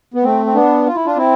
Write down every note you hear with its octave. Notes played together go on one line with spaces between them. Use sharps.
B3
A3 C4
C4
B3 D4
F4
E4
D4 F4
C4 E4